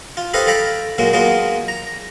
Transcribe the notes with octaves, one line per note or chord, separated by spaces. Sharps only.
F4
G4 A4 B4 C5 D#5 F5
A4 F5 G5 A#5 B5
A#2 F#3 G#3 A#3
F#3 G#3 A#3 B3 D#4 F4
A#5